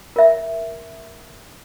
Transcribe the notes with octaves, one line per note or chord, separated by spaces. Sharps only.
A#4 E5